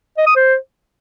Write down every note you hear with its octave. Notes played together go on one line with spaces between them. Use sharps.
D#5
D#6
C5